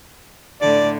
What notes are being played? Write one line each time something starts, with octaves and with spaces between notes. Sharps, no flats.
A2 D3 D5